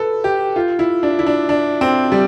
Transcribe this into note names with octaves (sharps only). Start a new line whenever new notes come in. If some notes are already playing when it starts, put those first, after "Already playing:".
Already playing: A4 B4
G4
F4
E4
D4
E4
D4
D4
C4
G3